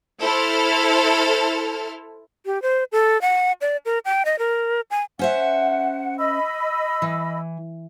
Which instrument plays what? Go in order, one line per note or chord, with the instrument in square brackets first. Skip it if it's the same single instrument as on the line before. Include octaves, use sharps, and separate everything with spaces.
[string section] E4 A4 C5 F6
[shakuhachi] G4
C5
A4
F#5
D5
A#4
G5
D#5
A#4
G#5
[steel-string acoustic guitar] C#4 C5 E5 [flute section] F#5
[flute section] D#5 B5 E6
[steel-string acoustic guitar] E3